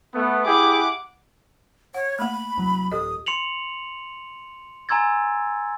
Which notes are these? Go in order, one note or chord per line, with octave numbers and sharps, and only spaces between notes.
A3 B3
E4 G4 G#4 F#5 D6
C#5 F#5
A3 A#3 B5
C2 F#3
D#1 G4 A4 D#5 D#6
C6 C#7 F7 F#7
G#5 A#5 C6 E6 G#6 A6